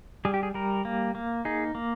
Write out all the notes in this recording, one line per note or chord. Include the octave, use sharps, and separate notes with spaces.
G3 G#4
G4
G#4
G3 A#4
A#3
A#3
D#4 G#4
A#3